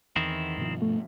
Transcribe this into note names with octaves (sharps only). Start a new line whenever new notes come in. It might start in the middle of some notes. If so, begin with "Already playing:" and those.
E2 D#3 C4 E4
G2 B2 F3
A3